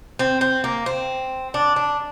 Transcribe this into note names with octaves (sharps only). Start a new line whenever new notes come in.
C4
C4
A#3
C4
D4
D4